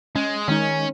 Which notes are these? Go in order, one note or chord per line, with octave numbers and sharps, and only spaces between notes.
G#3 C#4
D#3 G#3 C#4 D#4